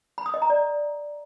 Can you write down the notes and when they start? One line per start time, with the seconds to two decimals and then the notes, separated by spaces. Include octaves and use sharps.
0.18 B5
0.26 D#6
0.34 D#5
0.42 A#5
0.50 D5